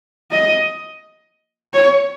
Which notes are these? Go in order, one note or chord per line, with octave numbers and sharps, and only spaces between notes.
D#5
C#5